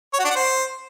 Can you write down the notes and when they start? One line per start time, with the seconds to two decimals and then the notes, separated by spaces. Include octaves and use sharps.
0.14 C#5
0.19 F#4
0.25 D4
0.30 F#5
0.36 C5